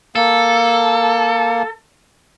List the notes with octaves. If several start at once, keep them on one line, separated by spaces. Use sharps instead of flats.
A#3 A4